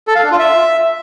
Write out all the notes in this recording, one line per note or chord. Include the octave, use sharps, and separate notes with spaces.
A4
F5
D4
F4
E5